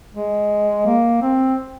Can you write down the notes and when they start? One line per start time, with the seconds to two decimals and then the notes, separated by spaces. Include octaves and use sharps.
0.14 G#3
0.86 A#3
1.22 C4